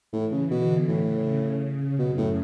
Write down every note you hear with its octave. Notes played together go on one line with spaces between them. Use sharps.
A2 E3
C#3
B2 D3
A2 C#3
C#3
F#2 B2
A2